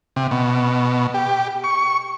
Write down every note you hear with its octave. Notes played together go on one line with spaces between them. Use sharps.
C3
B2
G4
C#6